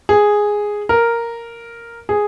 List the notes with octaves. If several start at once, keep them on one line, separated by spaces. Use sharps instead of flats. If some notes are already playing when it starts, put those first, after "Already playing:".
G#4
A#4
G#4